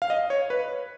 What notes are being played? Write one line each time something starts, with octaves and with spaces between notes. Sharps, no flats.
F5
D#5
C#5
B4